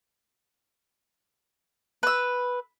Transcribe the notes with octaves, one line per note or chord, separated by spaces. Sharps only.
B4 E6